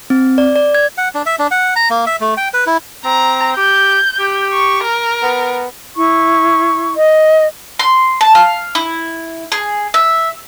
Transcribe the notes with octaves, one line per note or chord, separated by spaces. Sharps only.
C4
D5
D5
G#6
F#5
D4
E5
D4
F#5
A#5
A#3
E5
A3
G5
B4
E4
C4 A#5
G4 G6
G4
C#6
A#4
B3
E4 C#6
D#5
C6
A5
F5
E4
G#4
E5